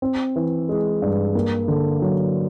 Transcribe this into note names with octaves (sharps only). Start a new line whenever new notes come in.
C4
E3
G#3
G2
A#3
D3
F#3